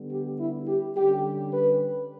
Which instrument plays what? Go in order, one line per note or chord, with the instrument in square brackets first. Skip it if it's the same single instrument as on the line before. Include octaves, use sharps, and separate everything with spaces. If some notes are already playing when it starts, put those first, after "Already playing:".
Already playing: [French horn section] D3 G3 B3
G4
E4
G4
D3 G3 C#4 G4
B4